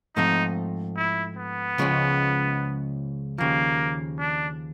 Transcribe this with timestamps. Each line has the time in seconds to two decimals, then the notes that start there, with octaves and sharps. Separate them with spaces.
0.16 G#2 F3 A3 C4 D#4
0.97 E4
1.37 B3
1.78 C#2 C#3 F3 G#3 C#4
3.38 D#2 C#3 F3 A#3
4.19 D4